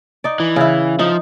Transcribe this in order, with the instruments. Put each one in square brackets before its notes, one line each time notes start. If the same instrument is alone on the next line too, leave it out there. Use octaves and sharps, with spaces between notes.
[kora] D#4 D5
[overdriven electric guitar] E3
[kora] C#3 E4
[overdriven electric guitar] F3 [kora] D#4